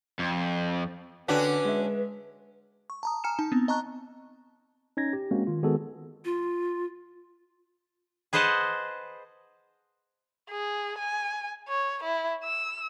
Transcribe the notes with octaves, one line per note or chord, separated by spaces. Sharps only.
F2
D3 C#4 D4 F#4 B4 G5 B6
G#3 E5
C#6
A5 A#5 D#6
G#5 A#5 F6 C#7 E7
D#4 A5
B3 C4
D#5 A5 A#5 C#6 F#6
C#4 D#4 G#6 A#6
G4
G#3 A#3 C4 C#4 F#4
D#3 F4
D#3 G#3 B3 F#4 G#4 A4
F4
G#4 B4 C5 D#5 F#5 A5
G#4
G#5
C#5
E4
E6